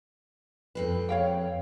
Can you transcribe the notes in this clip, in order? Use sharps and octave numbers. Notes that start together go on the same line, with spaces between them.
F2 C4 B4
C#5 F5 G5